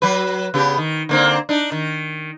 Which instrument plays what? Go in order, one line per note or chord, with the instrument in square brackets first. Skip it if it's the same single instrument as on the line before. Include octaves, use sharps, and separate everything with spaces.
[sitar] F#3 B4
C#3 B3 G4
D#3
D3 A#3 C4
D4 D#4
D#3